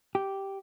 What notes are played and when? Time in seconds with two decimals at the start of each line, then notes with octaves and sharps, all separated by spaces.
0.15 G4